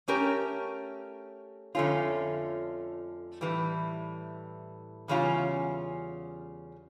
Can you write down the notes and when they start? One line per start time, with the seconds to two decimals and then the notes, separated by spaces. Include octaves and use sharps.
0.08 A3 C#4 G4 A#4
1.75 F2 D3 A3 C#4 F4
3.41 A2 E3 G3
5.08 E2 C#3 G3 C#4 F4